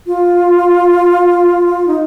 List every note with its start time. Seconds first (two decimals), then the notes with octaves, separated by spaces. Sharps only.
0.07 F4
1.87 D#4